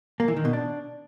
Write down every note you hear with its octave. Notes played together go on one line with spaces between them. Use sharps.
A#3
E3
D#3
B2
D4